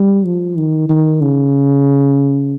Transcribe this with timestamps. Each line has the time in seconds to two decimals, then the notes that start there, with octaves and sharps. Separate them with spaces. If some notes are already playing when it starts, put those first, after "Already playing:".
Already playing: G3
0.25 F3
0.57 D#3
0.89 D#3
1.21 C#3